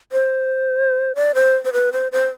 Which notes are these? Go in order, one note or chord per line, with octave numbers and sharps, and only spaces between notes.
C5
D5
C5
C5
B4
C5
C5